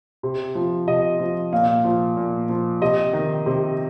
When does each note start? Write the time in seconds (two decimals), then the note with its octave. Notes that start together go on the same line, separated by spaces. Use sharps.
0.23 C3
0.55 F3
0.87 C3 D#5
1.20 F3
1.53 A#2 F5
1.84 F3
2.17 A#2
2.49 F3
2.81 C3 D#5
3.13 D#3
3.46 C3